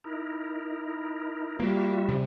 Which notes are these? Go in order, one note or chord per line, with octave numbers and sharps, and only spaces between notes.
D#4 E4 A#4
G3 A#3 F4 F#4 E5
C3